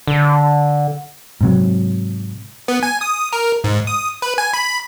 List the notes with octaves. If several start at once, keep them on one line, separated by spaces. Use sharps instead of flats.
D3
G#2 C3 F#3
B3
G#5
D#6
A#4
G#2
D#6
B4
G#5
B5